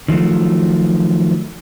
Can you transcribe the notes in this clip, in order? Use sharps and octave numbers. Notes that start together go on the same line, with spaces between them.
D#3 F3 F#3 A3